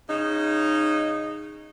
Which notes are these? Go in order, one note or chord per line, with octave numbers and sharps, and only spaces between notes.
C#3 D#4